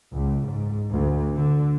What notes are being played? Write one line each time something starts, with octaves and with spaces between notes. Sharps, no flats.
C#2
G#2
D2
D3